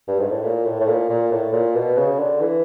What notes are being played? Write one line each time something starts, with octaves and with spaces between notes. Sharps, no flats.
G2
G#2
A2
A#2
A2
A2
A#2
A#2
A2
A#2
B2
C#3
D3
E3